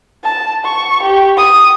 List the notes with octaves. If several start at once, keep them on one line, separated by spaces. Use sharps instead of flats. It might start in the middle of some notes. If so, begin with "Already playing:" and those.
A5
C#6
G4
D#6